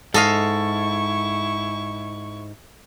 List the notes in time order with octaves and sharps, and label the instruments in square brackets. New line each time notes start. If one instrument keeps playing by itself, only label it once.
[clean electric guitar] G#2 [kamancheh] E4 C#6 [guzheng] A4 D#5 F5